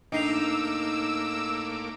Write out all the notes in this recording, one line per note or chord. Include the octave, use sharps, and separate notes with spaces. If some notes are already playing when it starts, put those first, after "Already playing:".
A2 A#3 D4 D#4 D6 E6 C7 F7